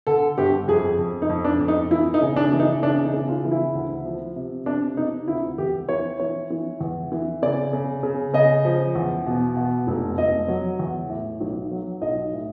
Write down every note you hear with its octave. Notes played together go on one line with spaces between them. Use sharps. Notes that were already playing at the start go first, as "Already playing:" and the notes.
D3 A4
G1 G4
F2 G#4
F2
D#4
F2
D4
F2
D#4
E3 E4
D#4
C#3
D4
E3
D#4
C#3 D4
D#4
C#3
F4
E3
E4
D2
F3
C3
C3 D4
C3 D#4
D2 E4
E2 G4
E3 C#5
E3 C#5
E3
E2
E3
C#3 D5
C#3
C#3
C#3 D#5
F3
E2
B2
B2
F1
F1 D#5
F#3
E2
A2
B1
F#3
B1 D#5
A2